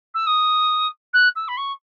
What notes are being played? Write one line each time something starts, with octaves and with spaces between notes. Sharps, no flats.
E6
D#6
F#6
E6
B5
C#6